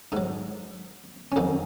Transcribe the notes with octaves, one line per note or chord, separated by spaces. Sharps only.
G#2 F#3 D#4
C#4
F2 D#3 F#3 D#4